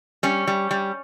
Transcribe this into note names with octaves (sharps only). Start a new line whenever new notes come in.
G3 C#4
G3
G3